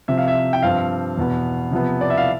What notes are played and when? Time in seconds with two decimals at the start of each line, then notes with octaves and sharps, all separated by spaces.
0.08 C3 F3 C4 E5
0.18 F5
0.28 E5
0.53 G5
0.63 G2 F3 C4 F5
1.17 E2 B2 B3
1.72 C3 F3 B3
2.01 D5
2.10 E5
2.18 F5